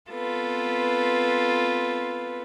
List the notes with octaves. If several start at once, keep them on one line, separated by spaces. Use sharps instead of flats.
B3 C4 F4 A4 B4